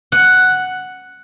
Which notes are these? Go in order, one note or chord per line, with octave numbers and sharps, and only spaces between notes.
F#5